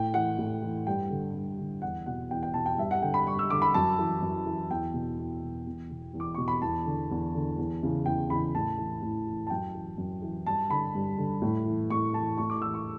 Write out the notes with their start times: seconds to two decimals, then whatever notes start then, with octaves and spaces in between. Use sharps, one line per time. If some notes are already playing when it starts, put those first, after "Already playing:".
Already playing: A2 G5
0.14 E3 F#5
0.38 A2
0.63 E3
0.87 G2 G5
1.10 D3
1.34 G2
1.59 D3
1.82 E2 F#5
2.06 B2 F#5
2.31 E2 G5
2.43 G5
2.54 B2 A5
2.66 G5
2.78 G2 E5
2.91 F#5
3.02 D3 G5
3.14 B5
3.26 G2 C#6
3.39 E6
3.50 D3 D6
3.62 B5
3.74 F#2 A5
3.99 E3
4.22 F#2
4.46 E3
4.70 E2 G5
4.94 B2
5.19 E2
5.43 B2
5.67 E2
5.90 B2
6.14 E2
6.20 D6
6.35 B2 C#6
6.48 B5
6.62 E2 A5
6.86 D3
7.11 E2
7.35 D3
7.58 E2
7.83 C#3 E3
8.06 E2 G5
8.30 C#3 E3 B5
8.55 A2 A5
8.78 E3
9.02 A2
9.27 E3
9.47 A5
9.50 F#2 G5
9.75 E3
9.98 F#2
10.22 E3
10.46 G2 A5
10.70 D3 B5
10.94 G2
11.18 D3
11.42 A2
11.66 E3
11.90 A2 C#6
12.14 E3 A5
12.38 A2 C#6
12.50 D6
12.62 E3 E6
12.74 C#6